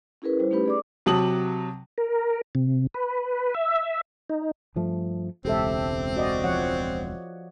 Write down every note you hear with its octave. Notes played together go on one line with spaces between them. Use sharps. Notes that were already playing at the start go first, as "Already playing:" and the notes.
C#4 E4 G#4 A#4 B4
G3 E4 C5
A3 C#4 D#4 G4 B4 B5
G#4 D5 D6
C3 F#3 A5 D#6 F#7
A#4
C3
B4
E5
D#4
G2 F3 A3
E1 C#2 C4 G4 A4 E5
F#4 D5 D#5
F3 C#5 F#5